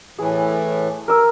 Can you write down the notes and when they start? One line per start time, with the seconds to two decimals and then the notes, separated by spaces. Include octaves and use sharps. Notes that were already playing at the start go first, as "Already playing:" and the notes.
0.18 A2 E3 G#4
1.08 A#4 E6